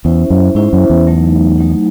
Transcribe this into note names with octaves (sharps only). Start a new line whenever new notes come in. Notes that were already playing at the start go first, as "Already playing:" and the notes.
E2 C#4 E4 C5 E5
F#2
G#2 C#4 E4 C5 E5
F#2
E2
F#3 A3 D#4
F#3 A3 D#4